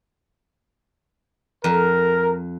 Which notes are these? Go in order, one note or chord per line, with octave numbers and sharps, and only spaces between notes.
F2 A#4